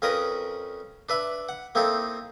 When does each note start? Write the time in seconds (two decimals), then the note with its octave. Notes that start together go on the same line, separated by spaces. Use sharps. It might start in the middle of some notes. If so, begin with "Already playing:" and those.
0.02 F2 C#4 A#4 B4 D#5 A#5
1.09 D4 B4 E5 B5
1.49 F#5
1.75 A#3 C4 D#4 E4 A4